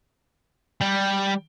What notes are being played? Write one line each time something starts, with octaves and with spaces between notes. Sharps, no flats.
G3